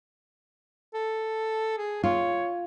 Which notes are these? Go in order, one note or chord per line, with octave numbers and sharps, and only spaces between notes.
A4
G#4
F4 C#5